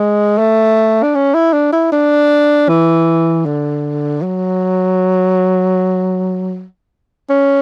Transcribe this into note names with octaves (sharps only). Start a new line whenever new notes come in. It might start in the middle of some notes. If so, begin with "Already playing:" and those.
Already playing: G#3
A3
D4
C#4
E4
D4
E4
D4
E3
D3
F#3
C#4